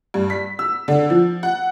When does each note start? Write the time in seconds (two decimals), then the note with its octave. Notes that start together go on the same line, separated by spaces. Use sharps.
0.14 G2
0.30 B6
0.59 E6
0.88 D3
1.10 F3
1.43 F#5